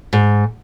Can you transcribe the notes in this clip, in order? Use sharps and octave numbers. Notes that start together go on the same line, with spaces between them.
G#2